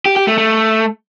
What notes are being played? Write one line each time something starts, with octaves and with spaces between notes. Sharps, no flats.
G4
G4
A3
A3